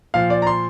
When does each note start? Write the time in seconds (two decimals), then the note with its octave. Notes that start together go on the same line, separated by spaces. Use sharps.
0.14 A#2 F3 F5
0.30 D5
0.42 A#5
0.47 C6